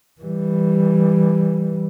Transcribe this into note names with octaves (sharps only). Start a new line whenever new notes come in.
E3 G3